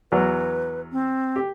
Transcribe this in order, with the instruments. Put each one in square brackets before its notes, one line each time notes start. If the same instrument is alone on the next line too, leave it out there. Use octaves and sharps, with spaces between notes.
[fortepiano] E2 F#3 [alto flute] B4
[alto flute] C4
[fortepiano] G4